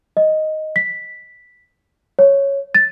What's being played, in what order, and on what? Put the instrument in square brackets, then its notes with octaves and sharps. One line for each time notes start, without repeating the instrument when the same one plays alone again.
[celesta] D#5
B6
C#5
A6